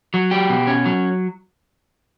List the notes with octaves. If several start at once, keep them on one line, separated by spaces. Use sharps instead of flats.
F#3
G4
B2
C#4
F#3